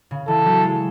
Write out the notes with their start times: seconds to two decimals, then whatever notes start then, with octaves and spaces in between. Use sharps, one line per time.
0.11 C#3
0.28 E3 A4
0.46 F#3
0.64 G#3